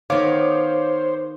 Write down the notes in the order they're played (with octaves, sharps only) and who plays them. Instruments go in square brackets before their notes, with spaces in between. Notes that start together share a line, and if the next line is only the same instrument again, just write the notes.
[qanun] D#3 B3 [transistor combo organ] C5 [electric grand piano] C#5 F5 D6